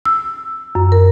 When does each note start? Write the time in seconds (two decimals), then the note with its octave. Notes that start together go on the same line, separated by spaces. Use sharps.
0.05 E6
0.75 F#2
0.92 A#4